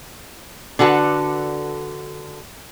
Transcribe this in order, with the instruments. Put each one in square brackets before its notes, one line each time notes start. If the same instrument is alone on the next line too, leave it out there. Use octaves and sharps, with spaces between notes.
[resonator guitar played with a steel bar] D3 F#4 A4 B4